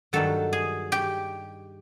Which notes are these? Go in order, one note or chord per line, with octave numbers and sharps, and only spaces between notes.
G2 D#3 F#3 A4
G#4
G4